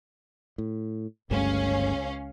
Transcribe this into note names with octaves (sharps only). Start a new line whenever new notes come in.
A2
G1 C#2 G2 A3 C#4 F5